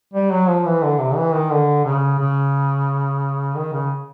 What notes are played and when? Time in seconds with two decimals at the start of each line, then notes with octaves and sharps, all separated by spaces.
0.14 G3
0.31 F#3
0.49 F3
0.66 E3
0.83 D3
0.99 C3
1.16 E3
1.34 D#3
1.51 D3
1.85 C#3
2.19 C#3
3.55 D#3
3.73 C#3